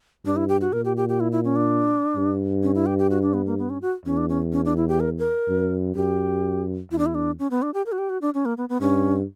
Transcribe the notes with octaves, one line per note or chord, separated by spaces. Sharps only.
G2 D4
E4
G4
F#4
A#2 A#4
G4
G4
G4
E4
E4
C#4
D4
G2
C#4
E4
G4
G4
F#4
D4
B3
A#3
B3
C#4
F#4
E2 C#4
D4
C#4
C#4
D4
E4
G4
A#4
A#4
F#2
F#2 G4
E2 E4
D4
E4
D4
C#4
B3
D4
G4
A#4
F#4
G4
F#4
D4
C#4
A#3
B3
B3
G2 C#4